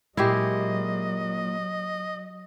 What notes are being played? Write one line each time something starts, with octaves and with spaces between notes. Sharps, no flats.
A#2 F#3 G#3 E4 G4 D#5